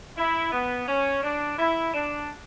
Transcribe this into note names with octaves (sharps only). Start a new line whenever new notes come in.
E4
B3
C#4
D4
E4
D4